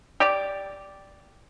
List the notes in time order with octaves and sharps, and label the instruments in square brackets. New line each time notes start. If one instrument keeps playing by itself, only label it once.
[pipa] G4 D5